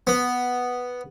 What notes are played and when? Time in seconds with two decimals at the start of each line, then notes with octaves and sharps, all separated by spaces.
0.07 B3